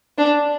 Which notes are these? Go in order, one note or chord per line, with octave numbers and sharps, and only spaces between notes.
D4